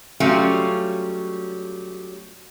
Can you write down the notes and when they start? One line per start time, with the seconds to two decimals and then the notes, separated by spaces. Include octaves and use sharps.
0.20 F#3 G3 A3 C#4 F4